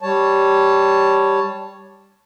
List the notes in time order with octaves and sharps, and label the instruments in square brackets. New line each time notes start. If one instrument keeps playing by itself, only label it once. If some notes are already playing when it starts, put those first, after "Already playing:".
[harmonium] G3 C#5 A5